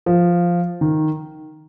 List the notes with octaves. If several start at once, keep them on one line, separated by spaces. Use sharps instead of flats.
F3
D#3